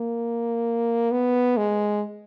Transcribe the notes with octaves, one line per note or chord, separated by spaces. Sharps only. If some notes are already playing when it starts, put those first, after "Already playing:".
Already playing: A#3
B3
G#3